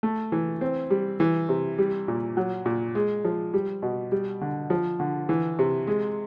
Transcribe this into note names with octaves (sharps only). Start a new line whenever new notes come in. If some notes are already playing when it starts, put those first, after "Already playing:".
A3
E3
C4
G3
E3
C3
G3
A#2
F#3
A#2
G#3
F3
G3
B2
G3
D3
F3
D3
E3
C3
G#3